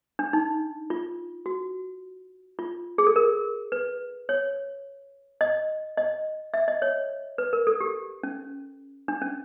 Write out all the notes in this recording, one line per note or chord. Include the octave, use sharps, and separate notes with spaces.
D4
D#4
F4
F#4
F4
G#4
A4
A#4
B4
C#5
D#5
D#5
E5
D#5
C#5
B4
A#4
A4
G4
C#4
D4
C#4